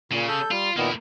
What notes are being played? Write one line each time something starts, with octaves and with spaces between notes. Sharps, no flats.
A#2 C#3
A4 G6
G3 F4
A#2 D#3 A#3 B3 E4